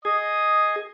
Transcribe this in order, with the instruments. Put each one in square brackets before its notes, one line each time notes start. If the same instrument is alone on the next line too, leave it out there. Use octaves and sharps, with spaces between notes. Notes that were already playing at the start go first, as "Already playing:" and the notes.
[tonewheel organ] G#4 [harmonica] D#5 D#6